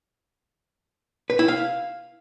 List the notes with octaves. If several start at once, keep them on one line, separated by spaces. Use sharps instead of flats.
B4
E4
F5